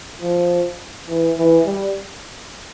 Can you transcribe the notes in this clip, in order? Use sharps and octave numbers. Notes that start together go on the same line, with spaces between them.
F3
E3
E3
G3